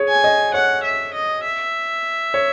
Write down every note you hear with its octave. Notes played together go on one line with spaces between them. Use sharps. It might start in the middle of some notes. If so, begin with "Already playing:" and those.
Already playing: G#4 C#5
G#5
D#5
C#5 F#5
E5
D#5
E5
C#5